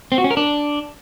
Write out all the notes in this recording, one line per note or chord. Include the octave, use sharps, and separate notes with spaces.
C4
F#4
C#4
A#4
D4